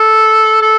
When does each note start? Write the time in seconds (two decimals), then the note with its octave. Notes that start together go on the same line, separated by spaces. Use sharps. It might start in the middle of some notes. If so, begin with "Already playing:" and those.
Already playing: A4
0.61 A4